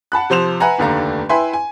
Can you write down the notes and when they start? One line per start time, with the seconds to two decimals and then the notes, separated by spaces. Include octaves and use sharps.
0.12 F#5 A5 B5 F#6
0.30 C3 F3 C5 E7 F7
0.60 B4 E5 F#5 G#5 A#5
0.78 F1 D#2 D3 A3 F5 A#5
1.29 E4 B4 E5 G5 G#5 C6
1.53 G#5